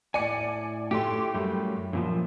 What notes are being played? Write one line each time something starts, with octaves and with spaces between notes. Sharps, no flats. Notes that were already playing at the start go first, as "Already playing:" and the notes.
A2 D5 G#5 C#7
A2 A3 G4 C6
F#2 G3 A3
F#2 A#2 F3